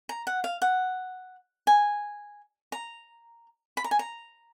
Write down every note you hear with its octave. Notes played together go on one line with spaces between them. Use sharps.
A#5
F#5
F5
F#5
G#5
A#5
B5
A#5
G#5
A#5